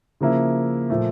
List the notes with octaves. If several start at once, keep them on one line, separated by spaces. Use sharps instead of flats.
C#3 F3 A#3 E4
A#2 F3 A3